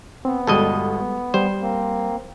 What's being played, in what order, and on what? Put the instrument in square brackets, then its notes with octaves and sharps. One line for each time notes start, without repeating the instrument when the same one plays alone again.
[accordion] B3 [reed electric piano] C4
[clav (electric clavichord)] G1 B2 D#5 [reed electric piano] G3 G#3 A4
[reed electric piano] G3 [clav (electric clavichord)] C5
[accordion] A#3 C4